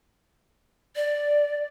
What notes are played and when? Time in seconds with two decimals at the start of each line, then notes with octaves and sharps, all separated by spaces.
0.96 D5